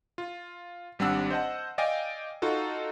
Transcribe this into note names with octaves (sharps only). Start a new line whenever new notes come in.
F4
G#1 G3 C4 D4 F#5 E6
C5 D#5 F#5 A5
D5 D#5 F5 G5 G#5
D#4 F4 F#4 A4